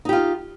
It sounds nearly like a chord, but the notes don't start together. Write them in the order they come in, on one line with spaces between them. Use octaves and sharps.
D#4 G4 F4